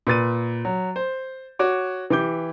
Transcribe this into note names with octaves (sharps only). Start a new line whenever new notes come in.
A#2 B4 A6 D#7
F#3
C5
F#4 C#5 D6
E3 G4 D6 G6